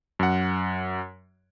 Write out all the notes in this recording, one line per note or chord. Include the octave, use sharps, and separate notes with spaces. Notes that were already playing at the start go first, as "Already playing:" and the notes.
F#2 F#5